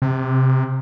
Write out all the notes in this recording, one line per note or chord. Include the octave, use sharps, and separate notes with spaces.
C3